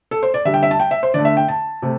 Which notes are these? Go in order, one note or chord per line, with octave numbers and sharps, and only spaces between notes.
A4
C5
D5
D3 G3 E5
G5
E5
A5
G5
E5
C5
D3 A3 D5
E5
G5
A5
C3 A3